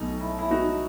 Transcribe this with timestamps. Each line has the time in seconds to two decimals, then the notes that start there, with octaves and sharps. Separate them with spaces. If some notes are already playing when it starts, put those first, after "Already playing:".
Already playing: B1 B2 A3 D#4
0.21 E4
0.39 E4
0.50 D#4 F#4